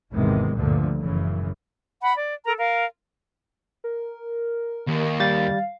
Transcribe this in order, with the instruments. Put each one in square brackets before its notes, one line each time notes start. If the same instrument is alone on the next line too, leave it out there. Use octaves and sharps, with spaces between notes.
[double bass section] G#1 E2 C3 D#3 G#3
D2 G2 A#2 D3 F3
F#1 F#2 C#3 E3
[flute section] F#5 B5
D5
A4 A#4 A#5
A#4 F5
[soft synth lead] A#4
[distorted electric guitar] D#2
[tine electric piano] G3 A6 [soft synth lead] F5